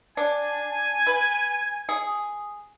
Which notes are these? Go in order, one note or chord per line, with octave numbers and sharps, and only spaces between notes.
D4 G#5
B4
G#4